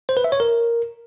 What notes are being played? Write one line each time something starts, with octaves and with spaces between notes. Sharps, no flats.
C5
B4
E5
C#5
A#4